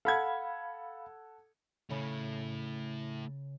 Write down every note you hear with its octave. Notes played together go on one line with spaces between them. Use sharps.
A4 F5 F#5 B5 G#6
C#3 A3 E4